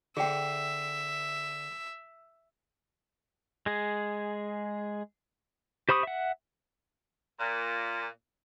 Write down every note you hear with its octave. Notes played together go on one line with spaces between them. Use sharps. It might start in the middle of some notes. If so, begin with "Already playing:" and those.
D3 G#4 C5 E5 G5
G#3 G#4
G4 C5 B5 C#6 D#6
E5 F#5
A#2